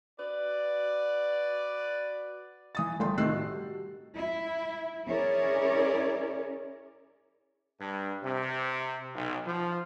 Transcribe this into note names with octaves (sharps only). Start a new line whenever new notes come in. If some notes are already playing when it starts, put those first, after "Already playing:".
F#4 B4 D5
E3 D#6 A6
G1 A3 G5 C6
A2 C3 D#3 E6 F#6 C7
G3 F#4
E4
C#4 E4 G#4 A#4 C#5 D5
G2
C3
B1
F3